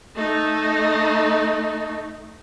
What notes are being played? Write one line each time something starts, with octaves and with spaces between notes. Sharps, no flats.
A3 D#4